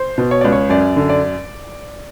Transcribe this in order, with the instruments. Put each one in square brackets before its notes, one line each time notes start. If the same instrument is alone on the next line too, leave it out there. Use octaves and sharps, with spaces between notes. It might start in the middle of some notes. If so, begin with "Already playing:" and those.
Already playing: [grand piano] C5
[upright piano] B2
[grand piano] C#5
[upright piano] C#2 [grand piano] D5
[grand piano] C#5
[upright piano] F#2 [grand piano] D5
[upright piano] D3
[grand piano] D5